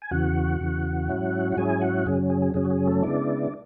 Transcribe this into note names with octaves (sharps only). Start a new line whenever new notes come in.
G#5
E2 C#3 E3 F#4 F#5
E2 C#3 E3
G#2 F#3 C#4 E4
F#5
G#2 F#3 C#4 E4 G#4 G#5
F#4 F#5
F#2 C#3 F#3 C#4 G#4
G#4
G#4
F#2 C#3 F#3 C#4 G#4
F#4
G#4
A3 A4
C#3 G#3 B3 D4 E4 D5